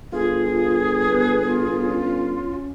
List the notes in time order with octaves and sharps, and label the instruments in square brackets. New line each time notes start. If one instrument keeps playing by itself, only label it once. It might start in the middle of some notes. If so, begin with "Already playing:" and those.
[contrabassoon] G1 [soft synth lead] F4 [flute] G#4
[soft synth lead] B3 [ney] B4
[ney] F4
[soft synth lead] C#4